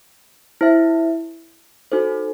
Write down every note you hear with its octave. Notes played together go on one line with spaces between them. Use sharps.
E4 C5 E5
D#4 F#4 A4 C5